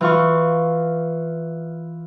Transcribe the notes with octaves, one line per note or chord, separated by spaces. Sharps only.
E3 F4 C#6